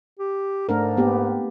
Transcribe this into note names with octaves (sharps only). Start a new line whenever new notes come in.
G4
G#2 A3 D4 A#4
A#3 B3 G4